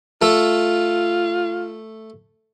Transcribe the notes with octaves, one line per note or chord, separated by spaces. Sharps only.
A3 F4 A4